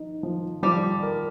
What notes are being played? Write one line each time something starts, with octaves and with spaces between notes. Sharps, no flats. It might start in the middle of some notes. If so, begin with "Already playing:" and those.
Already playing: F3 D#4
F3
F3 G3
A#4